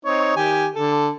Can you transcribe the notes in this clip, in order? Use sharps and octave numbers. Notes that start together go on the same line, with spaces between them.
C4 D#4 C#5
D#3 G4 G#5
D3 A4